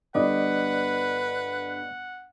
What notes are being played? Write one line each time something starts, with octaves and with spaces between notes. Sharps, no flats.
G1 G2 B4 D5 D#5 F#5